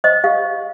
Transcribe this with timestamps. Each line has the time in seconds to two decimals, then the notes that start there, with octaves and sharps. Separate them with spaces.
0.04 C5 D#5
0.24 G4 F5